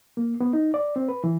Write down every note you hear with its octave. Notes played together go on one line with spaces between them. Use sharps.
A#3
B3
D#4
D5
C4
B4
E3